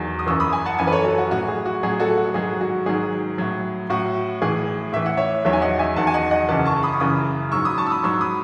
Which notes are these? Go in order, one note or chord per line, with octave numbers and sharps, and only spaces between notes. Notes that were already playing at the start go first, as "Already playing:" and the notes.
Already playing: E2 D#3 F#3
D#6
F#2 E3 C#6 E6
B5 D#6
G#5 B5
F#5 A5
F#2 E3 G#5 B5
B4
A4 C#5
F#4 A4
F#4
A2 F#3 F#4
G#4
F#4
A2 F#3 G#4
F#4 A4
F#4
G#2 D#3 F#3 G#4
F#4
G#2 D#3 F#3 G#4
A2 F#3
A2 F#3 F#4
A2 E3 G#4
A2 E3 E5
F#5
C#5 E5
E2 D#3 F#3 C#5 E5
G#5
D#5 F#5
E5 G#5
E2 D#3 F#3 F#5 A5
G#5
D#5 F#5
D#5 F#5
F#2 C#3 E3 F#5 A5
A5 C#6
B5 D#6
C#6
F#2 C#3 E3 B5 D#6
G#2 F#3 C#6 E6
B5 D#6
A5 C#6
E6
B5 D#6
G#2 F#3 C#6 E6
B5 D#6